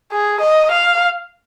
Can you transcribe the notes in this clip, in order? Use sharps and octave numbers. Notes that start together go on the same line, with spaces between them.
G#4
D#5
F5